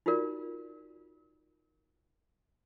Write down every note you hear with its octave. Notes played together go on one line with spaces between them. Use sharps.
D#4 F4 F#4 A#4 D5